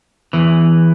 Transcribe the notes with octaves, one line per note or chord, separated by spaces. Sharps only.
E2 E3